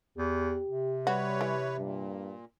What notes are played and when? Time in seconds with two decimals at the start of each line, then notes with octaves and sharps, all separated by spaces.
0.18 E2 G4
0.69 C3
1.07 G3 F#4 B4 C#5
1.41 E3
1.78 G2 A#2